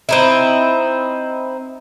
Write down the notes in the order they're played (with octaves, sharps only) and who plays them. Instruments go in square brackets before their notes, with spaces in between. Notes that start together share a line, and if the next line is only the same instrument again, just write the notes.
[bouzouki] C4 D#4 E4